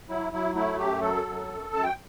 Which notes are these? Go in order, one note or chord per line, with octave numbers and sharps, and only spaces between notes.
F#3 E4
F#3 E4
A3 E4
F#2 G4
F#3 A4
F#2
F#2
F#2 A5
G5